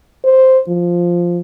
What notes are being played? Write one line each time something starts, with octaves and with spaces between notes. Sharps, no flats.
C5
F3